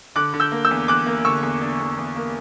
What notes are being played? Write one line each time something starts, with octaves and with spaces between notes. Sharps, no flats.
D3 D6 F#6
D3
E6 G6
A#3
E6 G6
E2
E2 D6 F#6
A#3
D3 C#6 E6
E2
D4
E2
E2
A#3